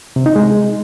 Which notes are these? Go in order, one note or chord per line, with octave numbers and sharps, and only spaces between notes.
C3
D#4
G#3